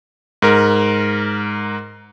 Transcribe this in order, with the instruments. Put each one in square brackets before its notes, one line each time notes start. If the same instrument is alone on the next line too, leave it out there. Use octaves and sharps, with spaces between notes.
[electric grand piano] G#2 A#4